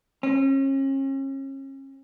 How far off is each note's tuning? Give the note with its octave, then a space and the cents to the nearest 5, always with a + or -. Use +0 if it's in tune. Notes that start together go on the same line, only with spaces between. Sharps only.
C#4 -35